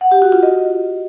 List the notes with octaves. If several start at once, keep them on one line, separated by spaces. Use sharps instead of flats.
F#5
G4
F#4
F4
D#5